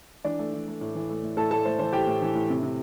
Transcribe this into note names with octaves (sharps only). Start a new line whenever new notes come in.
E3 D4 D5
A3
E3
A3
A2
E3
A3
A2
A2 A4 A5
A3 A4 A5
A3 C5
E3 C5
A2 G4 G5
A2
E3
A2
C3
C3